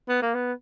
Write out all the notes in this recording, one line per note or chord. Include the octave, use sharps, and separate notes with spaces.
B3
A#3
B3